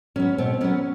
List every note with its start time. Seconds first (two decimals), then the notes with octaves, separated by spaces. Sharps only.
0.16 F#3 B3 C#4
0.38 B2 C4
0.61 F#3 B3 C#4